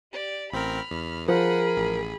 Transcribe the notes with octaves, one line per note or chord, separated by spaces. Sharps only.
G4 D5
A1 C4 A#4 B5 F6
E2
F3 G#4 A#4 F#5 B5
A1